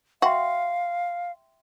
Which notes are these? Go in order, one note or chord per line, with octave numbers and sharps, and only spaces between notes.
F#4 E5 F5 G5 C6